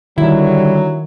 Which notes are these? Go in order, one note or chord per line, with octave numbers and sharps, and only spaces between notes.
D3 D#3 F#3 G3 E4